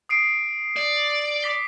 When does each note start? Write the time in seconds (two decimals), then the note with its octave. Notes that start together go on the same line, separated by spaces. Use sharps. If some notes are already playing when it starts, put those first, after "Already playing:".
0.09 D#6 C7 D7
0.77 D5
1.42 D6 B6 G7